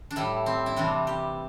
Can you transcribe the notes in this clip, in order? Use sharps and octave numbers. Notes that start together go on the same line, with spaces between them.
D4
A2 G3 E4
C4
E4
C3 E3 G3 D4
G4